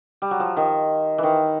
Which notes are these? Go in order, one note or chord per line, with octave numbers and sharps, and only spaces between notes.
G3
F#3
F3
D#3
D#3 E3